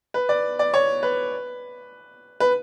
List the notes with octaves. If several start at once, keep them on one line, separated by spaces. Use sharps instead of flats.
B4
D5
D5
C#5
B4
B4